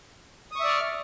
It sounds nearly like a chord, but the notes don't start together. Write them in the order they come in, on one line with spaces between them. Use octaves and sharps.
D#6 C#6 E5 D5 F6